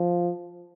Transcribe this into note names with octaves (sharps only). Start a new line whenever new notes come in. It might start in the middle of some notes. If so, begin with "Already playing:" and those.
Already playing: F3